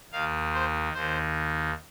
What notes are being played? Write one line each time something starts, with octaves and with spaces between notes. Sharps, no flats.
D#2 D#3 F5
C5
D#2 D#3 C5